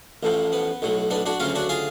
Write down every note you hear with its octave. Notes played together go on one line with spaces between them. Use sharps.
A1 A2 F3
B3
B1 A2 F#3
B3 D4
D4 F#4
D2 C#3 F#3 C#4 F4
D4 F#4
F4 G#4